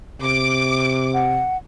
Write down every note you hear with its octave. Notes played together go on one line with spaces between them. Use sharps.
C3 D6
F#5